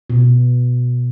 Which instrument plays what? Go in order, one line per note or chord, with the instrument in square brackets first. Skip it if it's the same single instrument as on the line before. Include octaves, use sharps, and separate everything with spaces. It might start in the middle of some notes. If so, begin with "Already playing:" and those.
[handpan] B2